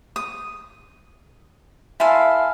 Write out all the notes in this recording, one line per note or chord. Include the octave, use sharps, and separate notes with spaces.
D#6
E4 A4 E5 F5 G#5 C6